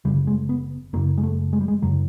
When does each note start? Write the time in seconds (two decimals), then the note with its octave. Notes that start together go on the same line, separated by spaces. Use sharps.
0.05 F#1 F#2 C#3 G3
0.27 G#3
0.49 B3
0.93 F#1 F#2 C#3 A#3
1.18 G#3
1.23 A3
1.53 G#3
1.61 G3
1.68 G#3
1.82 F#2 C#3 F#3